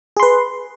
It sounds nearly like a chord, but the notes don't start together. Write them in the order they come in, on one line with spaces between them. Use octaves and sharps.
G#4 C6 B4